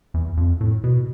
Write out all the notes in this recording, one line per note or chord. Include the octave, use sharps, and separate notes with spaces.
E2
F2
A2
B2